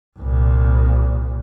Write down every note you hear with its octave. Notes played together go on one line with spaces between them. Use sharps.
C2 A#2